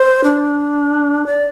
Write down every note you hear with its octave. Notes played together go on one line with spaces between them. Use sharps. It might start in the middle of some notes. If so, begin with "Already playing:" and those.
Already playing: C5
D4
D5